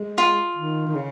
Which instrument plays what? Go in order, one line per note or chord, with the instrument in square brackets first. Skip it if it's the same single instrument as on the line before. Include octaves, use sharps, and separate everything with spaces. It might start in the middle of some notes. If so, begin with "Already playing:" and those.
Already playing: [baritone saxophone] G#3
[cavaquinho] F4
[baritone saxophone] D#3
D#3
C#3